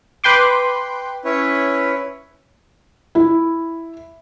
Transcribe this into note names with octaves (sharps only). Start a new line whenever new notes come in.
B4 G5 C6 D6
C#4 E4 B4 C#5
E4